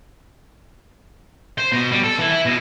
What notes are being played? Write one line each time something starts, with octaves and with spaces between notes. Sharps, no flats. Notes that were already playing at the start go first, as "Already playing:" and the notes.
C5
B2
G3
A4
E3
E4
B2